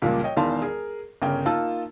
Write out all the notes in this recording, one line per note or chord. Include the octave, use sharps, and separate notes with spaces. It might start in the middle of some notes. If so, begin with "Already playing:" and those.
C#2 A#2 F3 G3 A#3
C#5 D#5 G5
E1 E2 D#3 F5 A5 C6
G#4 A#4
G1 C#3 C#4 A#4 G5
A#3 D#4 F4 A5 E6